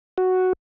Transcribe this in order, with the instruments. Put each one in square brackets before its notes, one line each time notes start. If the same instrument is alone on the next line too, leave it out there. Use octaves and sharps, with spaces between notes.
[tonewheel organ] F#4